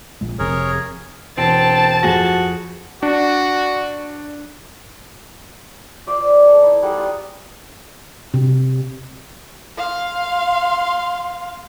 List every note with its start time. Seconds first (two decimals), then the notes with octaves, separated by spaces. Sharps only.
0.21 A#1 A#2 G#3
0.39 F1 F2 C3 G#4 A#4 C#5
1.37 E1 C4 A5
2.03 F2 F#4 G#4 A#6
3.03 D4 F#4
6.07 F4 C5 D5 E5
6.29 G#5
6.42 A4 E5
6.62 D#4 E4
6.82 G3 D#4 G#4 F#5
6.97 F4
8.34 C3
9.77 F5 C6